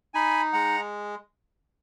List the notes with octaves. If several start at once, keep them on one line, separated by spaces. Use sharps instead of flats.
D#4 G#5 B5
G#3 F#5 A#5